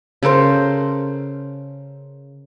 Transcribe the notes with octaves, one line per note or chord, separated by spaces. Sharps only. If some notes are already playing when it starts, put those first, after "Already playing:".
C#3 A4 A#4 C5